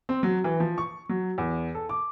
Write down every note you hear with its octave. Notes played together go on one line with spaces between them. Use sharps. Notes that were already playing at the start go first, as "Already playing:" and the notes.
C4
F#3
E3
F3
C#6
F#3
E2
A4
D6